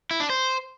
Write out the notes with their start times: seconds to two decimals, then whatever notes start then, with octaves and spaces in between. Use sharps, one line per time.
0.11 E4
0.20 D4
0.30 C5